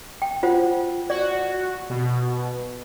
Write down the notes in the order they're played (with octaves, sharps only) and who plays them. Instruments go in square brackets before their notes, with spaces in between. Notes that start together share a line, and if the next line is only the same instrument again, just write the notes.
[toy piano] G5
F4 C5 F#5
[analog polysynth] F#4 [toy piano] D5
[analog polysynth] B2